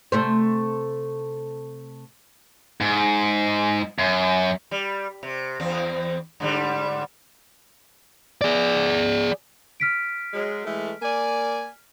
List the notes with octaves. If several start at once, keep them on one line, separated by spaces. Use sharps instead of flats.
C3 A3 C5
G#2
F#2
G3
C3
E2 C4
G#2 D3 G3
G#4 D5
F6 B6 D7
F#3 G#3
E3 G#3 A3
A#3 D5 G#5